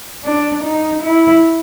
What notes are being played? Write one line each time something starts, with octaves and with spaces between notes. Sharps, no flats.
D4
D#4
E4